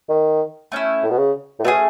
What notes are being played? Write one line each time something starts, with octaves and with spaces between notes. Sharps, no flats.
D#3
A3 C#4 E4
A2
B2
C#3
A2
B2 A3 C#4 G#4